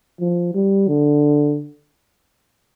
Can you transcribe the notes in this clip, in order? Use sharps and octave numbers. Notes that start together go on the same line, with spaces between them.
F3
G3
D3